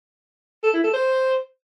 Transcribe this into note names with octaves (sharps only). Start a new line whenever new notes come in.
A4
E4
A4
C5